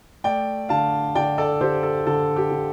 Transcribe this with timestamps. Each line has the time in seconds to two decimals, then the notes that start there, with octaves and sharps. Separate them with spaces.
0.24 A3 D5 G5
0.69 D3 F5 A5
1.15 D3 D5 G5
1.38 A4 D5
1.61 D3 G4 C5
1.83 A4
2.07 D3 A4
2.36 G4
2.51 D3